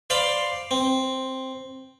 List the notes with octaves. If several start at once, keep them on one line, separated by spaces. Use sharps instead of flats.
C5 D5 F5 B5 C6 D6
C4